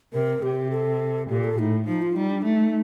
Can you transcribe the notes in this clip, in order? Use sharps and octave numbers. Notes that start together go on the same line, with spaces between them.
C3 A#4
C3 G4
A4
A#2 G4
A4
A2 D#4
F3 D#4
F4
G3 D#4
D4
A3 D#4